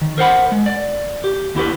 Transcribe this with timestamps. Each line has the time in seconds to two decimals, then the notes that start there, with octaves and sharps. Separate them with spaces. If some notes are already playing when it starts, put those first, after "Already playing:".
0.01 D#3
0.18 A#4 C5 F#5 B5
0.52 G#3
0.66 D5
1.24 G4
1.55 D#2 E4 G4 B4